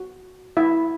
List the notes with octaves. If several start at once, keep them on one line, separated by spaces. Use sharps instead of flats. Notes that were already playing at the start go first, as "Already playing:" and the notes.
Already playing: F#4
E4 E5